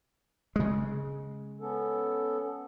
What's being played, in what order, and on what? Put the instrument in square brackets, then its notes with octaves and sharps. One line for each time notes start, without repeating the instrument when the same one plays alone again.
[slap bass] C#3 G#3
[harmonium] B3 C#4 A4